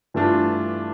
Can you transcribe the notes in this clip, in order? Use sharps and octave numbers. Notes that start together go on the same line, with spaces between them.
G2 E3 A3 D4 F4